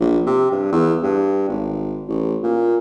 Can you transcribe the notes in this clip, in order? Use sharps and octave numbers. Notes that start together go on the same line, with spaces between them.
A#1
C3
G2
E2
G2
G#1
A1
A#2